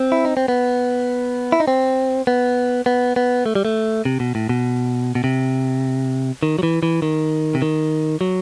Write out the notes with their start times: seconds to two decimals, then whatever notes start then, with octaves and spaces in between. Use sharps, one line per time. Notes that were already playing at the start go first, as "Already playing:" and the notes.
Already playing: C4
0.12 E4
0.25 D#4
0.37 C4
0.48 B3
1.52 E4
1.60 D#4
1.68 C4
2.27 B3
2.86 B3
3.16 B3
3.46 A3
3.55 G3
3.65 A3
4.05 C3
4.20 B2
4.35 A2
4.49 B2
5.15 B2
5.24 C3
6.43 D#3
6.59 F#3
6.63 E3
6.83 E3
7.02 D#3
7.55 C3
7.62 D#3
8.21 F#3